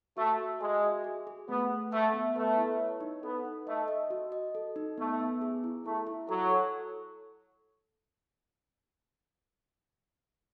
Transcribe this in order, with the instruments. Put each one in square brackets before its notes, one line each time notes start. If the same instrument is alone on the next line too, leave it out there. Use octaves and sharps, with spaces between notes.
[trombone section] A3 [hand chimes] F#4
[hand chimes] F#4
[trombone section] G#3 [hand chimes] E5
[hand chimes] F#4
G#4
G#4
[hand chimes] A3 [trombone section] B3
[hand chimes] A3
[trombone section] A3 [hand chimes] F#5
[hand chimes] B3
[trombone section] A3 [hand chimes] B4
[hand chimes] E4
C#5
D#4
[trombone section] B3 [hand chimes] A4
[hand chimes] D#4
[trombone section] A3 [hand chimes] D#5
[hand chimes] D#5
F#4
D#5
A4
D#4
[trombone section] A3 [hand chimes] B3
[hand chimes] B3
G#4
E4
[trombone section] A3 [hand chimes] E4
[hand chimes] E4
[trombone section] F#3 [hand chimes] A4
[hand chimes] A4